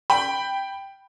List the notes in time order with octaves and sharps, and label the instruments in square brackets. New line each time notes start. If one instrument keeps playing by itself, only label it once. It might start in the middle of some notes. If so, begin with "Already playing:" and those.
[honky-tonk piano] G5 B5